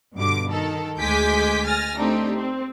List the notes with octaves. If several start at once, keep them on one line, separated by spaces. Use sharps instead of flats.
G2 B2 D3 D6
D#3 A4
D2 G#3 G#5 D6 G6 B6
G#5 F6 A6 A#6
A3 C4 D4 D#4 G4
C4